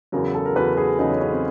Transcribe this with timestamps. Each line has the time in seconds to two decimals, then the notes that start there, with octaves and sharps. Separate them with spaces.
0.12 E2 C#3 F#3 A#4
0.35 A4
0.45 A#4
0.56 E2 C#3 F#3 B4
0.77 G#4
0.99 E2 C#3 F#3 D#4
1.10 C#4
1.20 C#4
1.31 C4